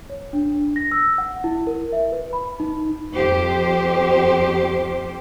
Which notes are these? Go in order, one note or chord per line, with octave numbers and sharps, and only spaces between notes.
C#5
D4
A#6
E6
F#5
E4
A#4
E5
B4
B5
D#4
F2 G4 C5